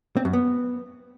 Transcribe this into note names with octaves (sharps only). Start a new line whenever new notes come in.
C4
F#2
B3